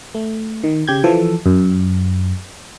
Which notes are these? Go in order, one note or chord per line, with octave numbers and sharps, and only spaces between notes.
A3
D#3
C#3 G4 G6 G#6
E3 F3 A4
F#2